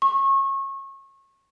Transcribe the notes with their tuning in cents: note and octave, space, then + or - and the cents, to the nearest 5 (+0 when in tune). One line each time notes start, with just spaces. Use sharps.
C#6 -30